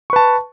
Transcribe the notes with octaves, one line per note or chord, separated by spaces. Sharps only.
B4 A5 C#6